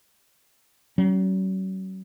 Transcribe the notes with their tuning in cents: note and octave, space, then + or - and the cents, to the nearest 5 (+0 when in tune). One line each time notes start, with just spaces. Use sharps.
F#3 +40 C#4 -10